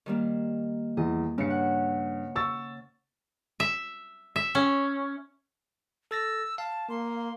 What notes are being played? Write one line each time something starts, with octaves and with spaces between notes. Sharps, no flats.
D#3 G3 A#3
E2 D#5
G2 C#3 C#7
F#5
C#6 E6 A6
E5
E5
C#4
A4 E6 A6 A#6
F5 A5
A#3 C6